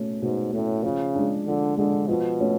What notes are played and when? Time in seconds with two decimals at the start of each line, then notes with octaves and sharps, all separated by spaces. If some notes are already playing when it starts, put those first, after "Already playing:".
Already playing: B2 A3 C#4
0.21 G#2 B2
0.53 A2 A3 C#4
0.83 C#3 F3
1.15 G#3 D4
1.46 D3 F3
1.77 D3 G#3 D4
2.08 B2 F3
2.40 A3 C#4